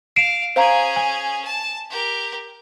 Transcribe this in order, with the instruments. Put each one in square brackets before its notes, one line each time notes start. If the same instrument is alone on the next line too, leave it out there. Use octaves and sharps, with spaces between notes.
[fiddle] F5 [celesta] C7 D7 E7
[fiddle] C#4 G#4 [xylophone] C5 F5 A#5
[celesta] G#5
[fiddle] A5
G4 A#4